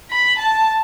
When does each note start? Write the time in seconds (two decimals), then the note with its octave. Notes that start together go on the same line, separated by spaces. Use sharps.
0.11 B5
0.39 A5